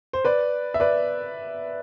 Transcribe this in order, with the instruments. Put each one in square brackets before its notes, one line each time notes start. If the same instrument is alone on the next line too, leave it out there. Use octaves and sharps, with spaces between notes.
[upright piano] C5
B4 D5
E5
B4 D5